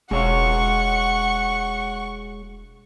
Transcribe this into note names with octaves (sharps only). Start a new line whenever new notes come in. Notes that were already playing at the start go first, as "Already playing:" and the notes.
E1 G#3 C#5 F5 F#5 C#6